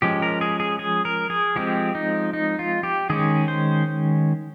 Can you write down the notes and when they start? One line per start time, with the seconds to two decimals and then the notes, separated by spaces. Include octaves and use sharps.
0.02 F3 G#3 C#4 G4
0.22 A#4
0.41 G#4
0.60 G#4
0.79 G#4
1.05 A#4
1.30 G#4
1.56 F3 G#3 C4 G4
1.95 D#4
2.33 D#4
2.59 F4
2.83 G4
3.10 D#3 G#3 C#4 G#4
3.48 C5